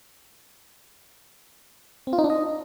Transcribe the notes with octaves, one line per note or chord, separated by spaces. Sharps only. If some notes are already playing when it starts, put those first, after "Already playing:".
C4
F4
D#4
D4
D#5